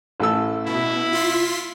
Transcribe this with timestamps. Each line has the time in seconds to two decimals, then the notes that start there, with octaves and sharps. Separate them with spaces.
0.20 A1 A4 E6
0.66 B2 E4
1.12 F4 C6 B6